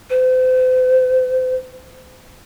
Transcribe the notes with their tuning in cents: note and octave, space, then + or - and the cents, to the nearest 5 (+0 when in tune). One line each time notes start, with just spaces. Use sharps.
C5 -40